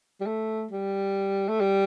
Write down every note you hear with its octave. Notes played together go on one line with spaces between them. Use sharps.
G3
A3
G3
A3
G3